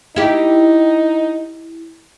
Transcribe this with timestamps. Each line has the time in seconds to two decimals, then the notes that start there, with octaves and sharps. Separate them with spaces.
0.16 D#4 E4 G4